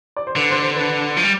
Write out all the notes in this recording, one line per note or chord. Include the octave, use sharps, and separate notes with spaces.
D5
C5
D3 B4
C5
C5
B4
F3
G3